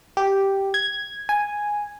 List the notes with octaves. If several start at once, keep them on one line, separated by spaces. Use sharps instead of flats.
G4
G#6
G#5